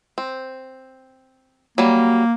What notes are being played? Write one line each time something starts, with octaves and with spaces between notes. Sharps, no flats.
C4
F#3 G3 A#3